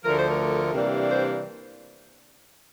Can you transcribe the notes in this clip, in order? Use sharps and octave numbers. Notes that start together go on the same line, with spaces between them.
D2 D3 F3 A3 A#4
C5
A#4
C3 E3 G3 A#3 D4
C5